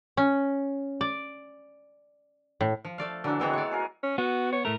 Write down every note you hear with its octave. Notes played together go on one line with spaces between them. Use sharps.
C#4
D5
A2
F3
A3 D5 F5
D3 E3 F#3 D4
D3 E3 F#3 G#3 B3 C4
C#5 D5
A#4 F5 G#5
C#4
B3 F#4
C#5
A2 A3 A#4